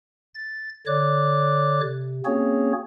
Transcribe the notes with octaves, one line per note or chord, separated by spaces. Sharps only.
A6
D3 C#5 D5 D6 F#6
C3
A#3 C4 C#4 F#4 G#4 C#5